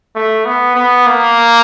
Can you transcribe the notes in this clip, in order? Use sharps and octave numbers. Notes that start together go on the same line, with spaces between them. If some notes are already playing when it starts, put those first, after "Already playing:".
A3
B3
B3
A#3